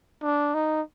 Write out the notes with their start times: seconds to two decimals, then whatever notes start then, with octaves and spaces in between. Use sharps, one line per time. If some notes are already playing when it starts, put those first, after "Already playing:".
0.22 D4
0.54 D#4